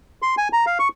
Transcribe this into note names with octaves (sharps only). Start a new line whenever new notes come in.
C6
G#5
A#5
F5
C#6